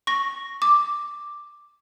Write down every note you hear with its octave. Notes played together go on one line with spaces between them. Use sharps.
C#6 A#6
D6